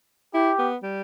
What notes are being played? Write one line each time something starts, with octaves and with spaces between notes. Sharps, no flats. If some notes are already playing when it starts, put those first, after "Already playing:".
E4 G4
B3
G3